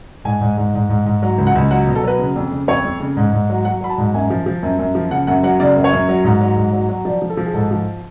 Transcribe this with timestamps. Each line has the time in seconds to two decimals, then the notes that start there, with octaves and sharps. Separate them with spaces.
0.25 G#2 G#5
0.41 G#2
0.57 G#2
0.74 G#2
0.89 G#2
1.06 G#2
1.22 F#3
1.38 C#2
1.47 F#5
1.55 C#2
1.71 F#3 F#5
1.87 B2
1.95 A4
2.04 F#3 B4
2.19 C#3
2.36 F2
2.51 C#3
2.68 F2 C#5
2.85 F2
3.00 C#3
3.17 G#2
3.33 G#2
3.50 F#3
3.65 F#3 F#5
3.81 F#3 B5
3.89 A5
3.98 G#2
4.14 F#2 G#5
4.30 F3
4.46 F3
4.63 F#2
4.79 F#2
4.95 F3
5.11 C#3 F#5
5.27 F#2 F#5
5.43 F#3 F#5
5.60 C#3 D5
5.76 F#2
5.84 C#5
5.93 F#2
6.09 F#3
6.25 G#2
6.41 F#3
6.56 G#2
6.73 F#3
6.89 F#3
7.05 F3 D5
7.22 F3
7.30 A4
7.37 F3
7.46 G#4
7.54 G#2 A4
7.71 F3